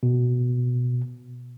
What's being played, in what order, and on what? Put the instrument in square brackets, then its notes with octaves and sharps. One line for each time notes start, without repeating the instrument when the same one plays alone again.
[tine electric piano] B2